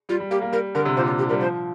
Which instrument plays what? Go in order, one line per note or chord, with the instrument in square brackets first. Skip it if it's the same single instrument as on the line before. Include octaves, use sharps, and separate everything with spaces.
[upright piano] G3 [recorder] F4
[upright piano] G3
[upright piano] A#3 [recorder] G4
[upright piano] A#3
[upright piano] G3 [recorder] A#4
[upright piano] D3 [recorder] A#4
[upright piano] C3
[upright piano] A#2 [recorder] C5
[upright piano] C3 [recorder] F4
[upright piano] D3 [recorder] G4
[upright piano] G3 [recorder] A#4
[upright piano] F3 [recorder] C5